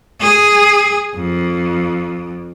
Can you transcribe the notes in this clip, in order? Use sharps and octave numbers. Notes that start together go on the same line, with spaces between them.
G#4
F2